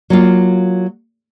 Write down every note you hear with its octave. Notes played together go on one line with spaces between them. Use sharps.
F#3 A#3 F4